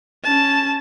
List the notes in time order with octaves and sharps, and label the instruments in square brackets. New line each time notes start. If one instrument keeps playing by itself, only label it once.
[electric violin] C#4 A5